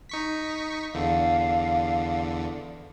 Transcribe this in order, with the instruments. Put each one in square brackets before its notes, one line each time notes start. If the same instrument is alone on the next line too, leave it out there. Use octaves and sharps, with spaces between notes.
[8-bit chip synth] D#4 C#6 B6
[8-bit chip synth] E2 D3 [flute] F5